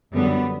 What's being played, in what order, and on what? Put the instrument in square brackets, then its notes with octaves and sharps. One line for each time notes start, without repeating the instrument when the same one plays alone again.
[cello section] F#2 D3 F#3 G3 B3